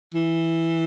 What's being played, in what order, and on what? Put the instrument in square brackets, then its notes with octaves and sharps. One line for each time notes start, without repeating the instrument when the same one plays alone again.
[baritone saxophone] E3